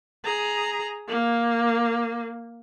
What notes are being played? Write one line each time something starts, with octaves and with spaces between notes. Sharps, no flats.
G#4 A#5
A#3